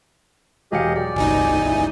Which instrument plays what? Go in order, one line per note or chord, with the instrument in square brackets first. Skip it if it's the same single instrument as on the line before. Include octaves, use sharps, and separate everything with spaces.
[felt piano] E1 F5 C#7 [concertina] G4 G#4 D#5
[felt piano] F#3 G#3 G5 [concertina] D5
[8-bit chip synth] G1 C#2 D#4 [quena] G#5
[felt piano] E4